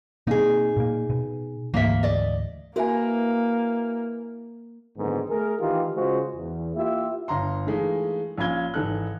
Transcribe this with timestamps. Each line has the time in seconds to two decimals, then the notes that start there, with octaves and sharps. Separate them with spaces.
0.27 B2 A#3 C4 D#4 G#4
0.77 A#2 A#3
1.10 B2
1.74 D2 G#2 E3 A#3 E5
2.03 D5 D#5
2.76 A#3 E4 F#4 A#4 B4 E5 G#5
4.97 F#1 G#2 D3 D#3 B3
5.29 A3 G#4 A#4
5.60 D#3 E3 D#4 F4 G4
5.95 C#3 G#3 F4 F#4 C5
6.35 E2
6.76 A#3 E4 F4 G4 E5
7.28 G1 F5 A#5 C6
7.67 E3 G#3 A3 D#4 F4
8.38 A#1 C#4 F4 B5 G#6 G7
8.74 G#1 E3 D#4 A4 F#6